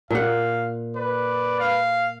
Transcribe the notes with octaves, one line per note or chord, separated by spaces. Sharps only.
A#2 F5 F#5
B4 D5
F5